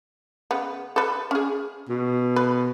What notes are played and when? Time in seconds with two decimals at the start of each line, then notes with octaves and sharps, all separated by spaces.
0.51 C#3 B3
0.96 A4 B4
1.31 C#4 G#4
1.89 B2
2.36 B4